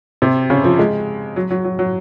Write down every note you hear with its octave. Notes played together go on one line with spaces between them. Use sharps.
C3
C#3
F3
G#3
F#3
F#3
F#3
F#3